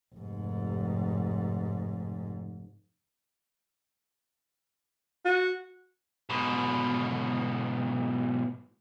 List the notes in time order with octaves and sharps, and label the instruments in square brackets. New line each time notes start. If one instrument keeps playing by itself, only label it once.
[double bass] F1 G#2
[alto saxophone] F#4
[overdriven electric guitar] G#2 B2